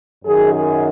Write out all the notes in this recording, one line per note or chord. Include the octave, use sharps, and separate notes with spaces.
F#2 D#3 G#4
G#4